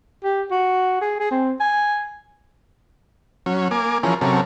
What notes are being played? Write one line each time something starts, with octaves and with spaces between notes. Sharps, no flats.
G4
F#4
G#4
G#4
C4
G#5
F#3 C#4
A#3 G#5 D6
E3 F3 C#4 G#4 A#4
C3 F#3 C#4 A4 A#4